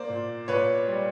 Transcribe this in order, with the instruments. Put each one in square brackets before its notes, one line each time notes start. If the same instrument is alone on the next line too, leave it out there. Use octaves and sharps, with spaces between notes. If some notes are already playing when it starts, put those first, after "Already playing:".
Already playing: [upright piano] A#3 C5 D5
A#2
A#2 B4 C#5
G3